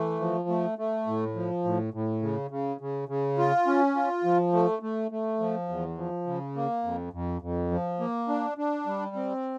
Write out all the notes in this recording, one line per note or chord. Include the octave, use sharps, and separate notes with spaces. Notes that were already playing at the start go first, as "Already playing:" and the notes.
Already playing: E3 A3
F3
A3
A3
A2
F3
A2
A2
C#3
C#3
C#3
C#3
F4
C#4
F4
F3
A3
A3
A3
F3
E2
F3
C#3
A#3
F2
F2
F2
F3
A#3
D4
D4
G3
C4